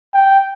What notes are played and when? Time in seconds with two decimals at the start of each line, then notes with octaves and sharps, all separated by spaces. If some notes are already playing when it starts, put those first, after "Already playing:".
0.14 G5